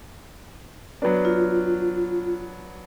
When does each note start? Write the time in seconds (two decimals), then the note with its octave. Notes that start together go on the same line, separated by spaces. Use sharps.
1.02 F#3 B3 D4
1.25 F4